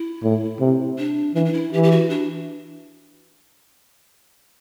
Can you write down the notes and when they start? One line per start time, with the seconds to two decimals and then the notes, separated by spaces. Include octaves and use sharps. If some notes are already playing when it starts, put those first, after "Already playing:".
Already playing: E4
0.23 A2
0.60 C3
0.98 D4
1.35 E3 D4
1.45 D4
1.54 E4
1.73 E3 G4
1.83 G4
1.92 F#4
2.10 D4